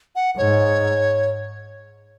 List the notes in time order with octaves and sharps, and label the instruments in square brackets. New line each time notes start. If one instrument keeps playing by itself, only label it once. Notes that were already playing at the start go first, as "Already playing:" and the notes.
[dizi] F#5
[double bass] G#2 [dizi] C#5